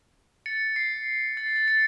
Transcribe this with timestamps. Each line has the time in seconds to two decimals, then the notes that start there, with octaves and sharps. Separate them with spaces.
0.46 A6 C#7
0.76 C7
1.37 A6
1.46 C7
1.56 A6
1.68 A6 C#7